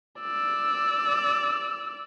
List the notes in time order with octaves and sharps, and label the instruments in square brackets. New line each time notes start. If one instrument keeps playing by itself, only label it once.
[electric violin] D5 E6